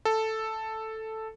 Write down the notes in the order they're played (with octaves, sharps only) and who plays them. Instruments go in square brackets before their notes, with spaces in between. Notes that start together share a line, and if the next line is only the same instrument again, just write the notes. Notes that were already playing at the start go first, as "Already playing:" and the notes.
[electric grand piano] A4